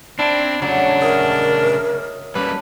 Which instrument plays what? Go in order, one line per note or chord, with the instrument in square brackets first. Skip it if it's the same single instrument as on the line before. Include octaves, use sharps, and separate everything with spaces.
[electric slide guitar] C4 [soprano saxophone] D4 [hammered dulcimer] E4
[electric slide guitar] C#3 A3 [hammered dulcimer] F#3 [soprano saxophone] D4
[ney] A#4 [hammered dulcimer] D#5 E5
[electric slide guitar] G3 A#3 [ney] C#4 [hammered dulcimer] A4 [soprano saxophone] B4